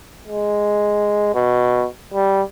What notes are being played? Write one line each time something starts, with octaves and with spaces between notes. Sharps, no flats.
G#3
B2
G3